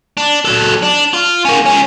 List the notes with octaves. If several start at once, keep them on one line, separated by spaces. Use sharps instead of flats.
D4
F#3 A4
D4
F4
A#3 C#4
G#3 C#4